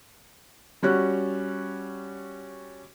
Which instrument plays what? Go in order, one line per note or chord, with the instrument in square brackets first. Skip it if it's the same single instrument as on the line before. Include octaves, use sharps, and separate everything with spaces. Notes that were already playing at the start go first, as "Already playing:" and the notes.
[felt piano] G3 C#4 F#4 F#6